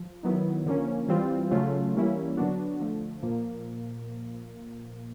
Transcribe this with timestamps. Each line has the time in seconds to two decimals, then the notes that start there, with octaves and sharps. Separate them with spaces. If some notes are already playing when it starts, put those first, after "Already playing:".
Already playing: F3
0.23 D#3 F#3 B3 E4
0.66 D3 F3 A#3 C#4
1.08 E3 G3 C4 F4
1.51 C#3 F#3 A3 C#4 F4
1.94 E3 G3 A#3 C#4 E4
2.37 D3 F#3 B3 D4 F#4
2.80 D3 F3 A3
3.23 A#2 F3 A#3